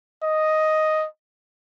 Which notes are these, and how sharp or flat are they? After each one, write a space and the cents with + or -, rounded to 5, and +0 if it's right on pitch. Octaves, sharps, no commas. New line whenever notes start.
D#5 +5